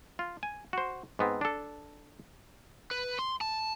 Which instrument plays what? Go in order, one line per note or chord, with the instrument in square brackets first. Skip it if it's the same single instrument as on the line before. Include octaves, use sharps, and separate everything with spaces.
[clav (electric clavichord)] F4
G#5
F#4 C5
G#2 B3 C4
D4 A4
[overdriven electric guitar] B4
C6
A5